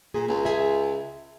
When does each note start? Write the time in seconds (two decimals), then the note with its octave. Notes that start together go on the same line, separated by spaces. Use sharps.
0.14 A#2 G#4
0.28 C#2
0.45 G#4 E5